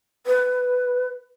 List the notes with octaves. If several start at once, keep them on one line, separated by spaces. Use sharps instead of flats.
B4